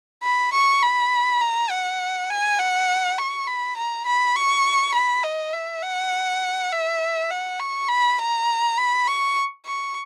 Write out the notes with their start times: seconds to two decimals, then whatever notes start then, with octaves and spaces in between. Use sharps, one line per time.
0.23 B5
0.53 C#6
0.82 B5
1.41 A#5
1.71 F#5
2.30 G#5
2.59 F#5
3.18 C#6
3.47 B5
3.77 A#5
4.06 B5
4.36 C#6
4.95 B5
5.24 D#5
5.53 E5
5.82 F#5
6.72 E5
7.31 F#5
7.59 C#6
7.89 B5
8.19 A#5
8.78 B5
9.08 C#6
9.66 C#6